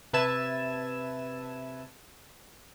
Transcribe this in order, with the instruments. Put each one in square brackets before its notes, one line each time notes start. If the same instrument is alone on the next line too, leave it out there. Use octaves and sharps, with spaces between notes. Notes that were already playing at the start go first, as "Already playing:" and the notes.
[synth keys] C3 B4 E5 A5 G#6 E7